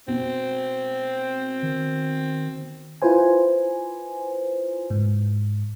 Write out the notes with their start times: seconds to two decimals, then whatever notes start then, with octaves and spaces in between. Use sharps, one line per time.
0.08 B2 C4
1.62 D#3
3.02 E4 F4 B4 C5 G#5
4.90 G#2